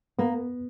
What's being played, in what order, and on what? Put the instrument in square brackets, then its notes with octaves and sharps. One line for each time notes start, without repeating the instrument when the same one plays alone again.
[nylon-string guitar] A#3 [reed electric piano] B3